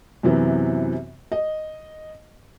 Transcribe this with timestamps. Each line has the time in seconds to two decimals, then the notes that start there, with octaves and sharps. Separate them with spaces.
0.23 F#2 C3 E3 B3
1.32 D#5